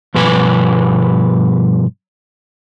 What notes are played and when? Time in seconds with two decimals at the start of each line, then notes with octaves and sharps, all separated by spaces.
0.15 G2 B2 F3 B4 G#5